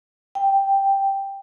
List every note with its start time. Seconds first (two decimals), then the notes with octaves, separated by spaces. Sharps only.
0.35 G5